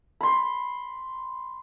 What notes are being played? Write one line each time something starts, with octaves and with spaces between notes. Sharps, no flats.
B5 C6